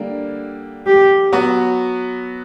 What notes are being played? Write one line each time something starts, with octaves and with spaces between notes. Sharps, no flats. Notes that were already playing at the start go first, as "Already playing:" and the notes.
Already playing: D3 G3 A#3
G4
F#3 B3 F#4